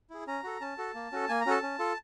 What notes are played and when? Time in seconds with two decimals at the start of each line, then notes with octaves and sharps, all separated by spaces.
0.10 E4 G#4
0.27 C#4 A#5
0.44 F#4 A4
0.61 C#4 A5
0.78 F#4 A4
0.94 A#3
1.12 C#4 F#4 A4
1.28 A#3 G#5
1.41 A#5
1.46 C#4 F#4 A4 A5
1.62 C#4
1.79 F4 A4